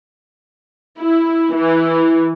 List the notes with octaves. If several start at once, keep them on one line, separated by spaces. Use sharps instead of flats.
E4
E3